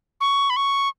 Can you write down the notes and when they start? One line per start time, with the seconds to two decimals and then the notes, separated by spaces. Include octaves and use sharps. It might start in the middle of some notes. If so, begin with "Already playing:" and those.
0.21 C#6
0.50 B5
0.56 C#6